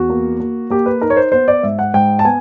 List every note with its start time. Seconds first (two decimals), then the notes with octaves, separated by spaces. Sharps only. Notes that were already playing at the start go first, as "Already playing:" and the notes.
Already playing: E2 F#4
0.10 A#3
0.40 A#3
0.70 A#3 G4
0.86 B4
1.02 D#4 A#4
1.10 C#5
1.17 C5
1.32 B3 C5
1.48 D5
1.63 G#2 E5
1.79 F#5
1.94 G#2 G5
2.19 A5
2.24 B3 G#5